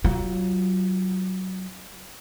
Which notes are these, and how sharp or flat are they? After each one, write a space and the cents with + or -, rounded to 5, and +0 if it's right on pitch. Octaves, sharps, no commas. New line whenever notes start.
F#3 +20 F4 +0